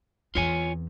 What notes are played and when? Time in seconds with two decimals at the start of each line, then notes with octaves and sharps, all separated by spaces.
0.35 E2 C4 F4 C#5 G#5